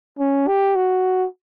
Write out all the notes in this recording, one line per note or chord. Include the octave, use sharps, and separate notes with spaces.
C#4
G4
F#4